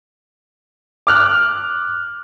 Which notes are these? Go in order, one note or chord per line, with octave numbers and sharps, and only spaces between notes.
D6 F6 F#6